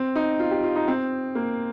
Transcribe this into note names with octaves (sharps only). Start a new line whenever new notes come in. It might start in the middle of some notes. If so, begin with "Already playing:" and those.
Already playing: C4
D#4
F4
G4
F4
D#4
C4
A#3